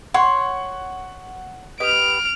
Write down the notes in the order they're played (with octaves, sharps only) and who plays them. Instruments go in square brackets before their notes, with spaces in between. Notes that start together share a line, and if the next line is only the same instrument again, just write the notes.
[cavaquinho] C#5 [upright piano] F#5 [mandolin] C6
[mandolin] G4 B4 D#5 [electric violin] F6 D7